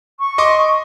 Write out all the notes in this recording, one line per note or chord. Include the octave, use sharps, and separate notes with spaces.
C#6
D#5 C6 D6